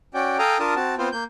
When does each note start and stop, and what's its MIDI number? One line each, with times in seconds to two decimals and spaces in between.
0.14 0.37 61
0.14 0.37 66
0.14 0.37 74
0.14 0.37 79
0.39 0.58 69
0.39 0.58 77
0.39 0.58 79
0.39 0.58 80
0.39 0.58 82
0.39 0.58 87
0.59 0.74 62
0.59 0.74 65
0.59 0.74 70
0.59 0.74 81
0.59 0.74 87
0.76 0.95 60
0.76 0.95 66
0.76 0.95 81
0.98 1.09 59
0.98 1.09 60
0.98 1.09 65
0.98 1.09 72
1.12 1.24 58
1.12 1.24 91